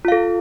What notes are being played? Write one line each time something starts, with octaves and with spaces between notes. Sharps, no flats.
F4 A4 F5